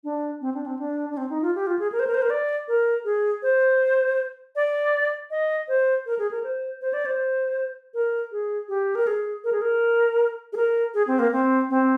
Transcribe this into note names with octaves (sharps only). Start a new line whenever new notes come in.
D4
C4
D4
C4
D4
D4
C4
D#4
F4
G4
F4
G#4
A#4
C5
A#4
C5
A#4
D5
A#4
G#4
C5
D5
D#5
C5
A#4
G#4
A#4
C5
C5
D5
C5
A#4
G#4
G4
A#4
G#4
A#4
G#4
A#4
G#4
A#4
G#4
C4
A#3
C4
C4